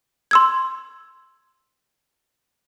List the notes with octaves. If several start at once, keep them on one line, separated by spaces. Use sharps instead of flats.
C6 E6 G#6